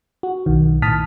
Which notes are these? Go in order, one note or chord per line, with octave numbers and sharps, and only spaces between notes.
F#4
B1 D#3
A2 A5 D#6 F6 B6